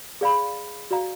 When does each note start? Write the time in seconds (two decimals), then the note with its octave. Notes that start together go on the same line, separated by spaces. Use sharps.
0.21 G#4 D5 F5 B5
0.91 F#4 D5 F5 A#5